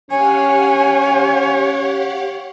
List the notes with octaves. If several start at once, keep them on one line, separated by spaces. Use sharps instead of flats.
C#4 G4 C#5 F5 F#5 G#5